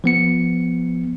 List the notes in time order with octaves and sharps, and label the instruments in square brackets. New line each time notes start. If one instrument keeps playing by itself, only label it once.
[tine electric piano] F3 B3 C#7